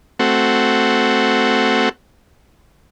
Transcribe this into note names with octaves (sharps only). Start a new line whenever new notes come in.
A3 C4 F#4